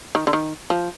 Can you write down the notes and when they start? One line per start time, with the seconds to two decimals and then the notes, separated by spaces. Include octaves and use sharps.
0.15 D#3
0.27 D3
0.33 D#3
0.70 F3